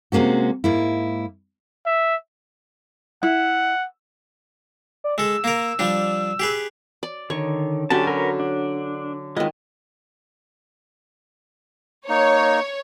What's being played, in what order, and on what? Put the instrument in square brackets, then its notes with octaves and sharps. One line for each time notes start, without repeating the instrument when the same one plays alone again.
[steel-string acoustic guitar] C3 G#3 A#3 C#4 F#4
G#2 A#3 E4
[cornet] E5
[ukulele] E4 [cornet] F#5
[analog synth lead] D5
[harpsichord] G#3 A4 [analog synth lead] E6
[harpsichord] A#3 A#4
F3 G3 D4
G4 G#4 B4
[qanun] D5
[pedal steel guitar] D3 D#3 [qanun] C#5
[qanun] D3 F#3 C#4 [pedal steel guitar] G4 A5
[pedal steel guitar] A#4 B4 C#5
D4
[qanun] D#3 D#5 [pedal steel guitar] G#3 B3 F4
[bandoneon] A#3 D#4 [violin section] C#5